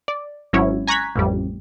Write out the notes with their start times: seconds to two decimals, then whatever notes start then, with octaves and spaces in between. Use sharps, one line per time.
0.08 D5
0.53 G#1 F#3 C#4 E4 C#5
0.88 G#5 A#5 C#6 F#6 G#6 B6
1.16 A1 F2 G3